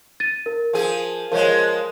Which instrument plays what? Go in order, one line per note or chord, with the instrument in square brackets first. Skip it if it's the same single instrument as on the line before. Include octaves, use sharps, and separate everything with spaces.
[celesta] A6 D#7
A#4
[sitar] F3 G#4
[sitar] F3 G#3 [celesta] A#4 C#5